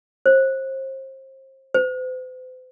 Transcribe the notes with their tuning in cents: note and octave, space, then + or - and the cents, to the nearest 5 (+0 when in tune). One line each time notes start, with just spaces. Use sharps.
C5 +30
C5 -45